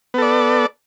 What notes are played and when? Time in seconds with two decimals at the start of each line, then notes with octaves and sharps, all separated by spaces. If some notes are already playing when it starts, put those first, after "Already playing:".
0.14 B3
0.18 A4
0.22 D5